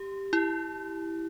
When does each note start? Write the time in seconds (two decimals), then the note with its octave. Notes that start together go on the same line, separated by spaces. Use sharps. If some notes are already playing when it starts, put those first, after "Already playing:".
Already playing: G4
0.33 E4